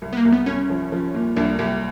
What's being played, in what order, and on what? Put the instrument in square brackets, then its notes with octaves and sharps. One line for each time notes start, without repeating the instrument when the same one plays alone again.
[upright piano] C2
[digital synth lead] B3
A#3
[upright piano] C2
[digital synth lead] B3
[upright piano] C2 [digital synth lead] C#4
[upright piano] F3
F3
A#2
[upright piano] C2 [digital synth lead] D4
[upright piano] C2 [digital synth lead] G4